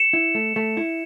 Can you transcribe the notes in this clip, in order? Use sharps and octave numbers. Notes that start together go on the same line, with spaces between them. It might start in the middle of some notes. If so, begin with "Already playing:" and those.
Already playing: C#7 E7
E4
A3
A3
E4